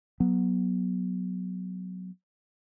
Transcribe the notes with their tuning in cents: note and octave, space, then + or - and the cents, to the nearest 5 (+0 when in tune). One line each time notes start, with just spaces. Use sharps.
F#3 +0 B3 -15